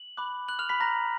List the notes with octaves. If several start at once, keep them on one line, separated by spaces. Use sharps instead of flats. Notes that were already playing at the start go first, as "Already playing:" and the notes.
Already playing: F#7
B5 D6 F#6
F#6 F#7
F6 F7
B5 B6
A#5 C#6 F#6 A#6